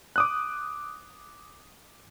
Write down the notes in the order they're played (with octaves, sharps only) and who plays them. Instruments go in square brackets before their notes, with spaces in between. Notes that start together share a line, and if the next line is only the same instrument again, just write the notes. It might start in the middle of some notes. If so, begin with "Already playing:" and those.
[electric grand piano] D6 D#6 F#6